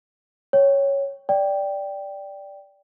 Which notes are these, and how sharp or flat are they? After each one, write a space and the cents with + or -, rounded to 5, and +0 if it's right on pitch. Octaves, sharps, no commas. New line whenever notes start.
C#5 +0 G5 +0
D5 -5 G5 +0